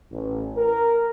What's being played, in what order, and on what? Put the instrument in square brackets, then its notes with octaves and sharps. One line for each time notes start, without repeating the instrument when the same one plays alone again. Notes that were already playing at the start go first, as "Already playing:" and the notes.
[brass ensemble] A1
A#4